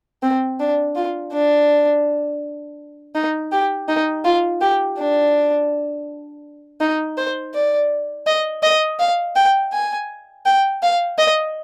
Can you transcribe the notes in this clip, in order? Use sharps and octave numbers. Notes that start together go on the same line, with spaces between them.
C4
D4
F4
D4
D#4
G4
D#4
F4
G4
D4
D#4
C5
D5
D#5
D#5
F5
G5
G#5
G5
F5
D#5